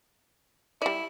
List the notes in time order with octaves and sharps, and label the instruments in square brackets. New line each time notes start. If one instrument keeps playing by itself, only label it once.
[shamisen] G3 D5 [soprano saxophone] E4